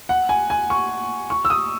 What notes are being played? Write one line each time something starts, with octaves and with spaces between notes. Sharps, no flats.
F#5
G#5
G#5
C#6
C#6
E6
D#6